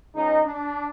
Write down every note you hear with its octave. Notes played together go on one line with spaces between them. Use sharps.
C#2 D#4
D4